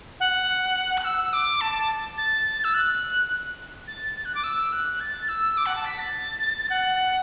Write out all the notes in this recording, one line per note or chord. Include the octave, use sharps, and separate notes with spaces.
F#5
F#6
E6
E6
D6
A5
A6
E6
F#6
A6
A6
F#6
D6
E6
F#6
A6
E6
D6
F#5
A5
B6
A6
F#5